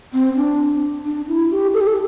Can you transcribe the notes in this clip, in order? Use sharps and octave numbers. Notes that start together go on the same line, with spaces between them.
C4
D4
D4
E4
G4
A4
G4
A4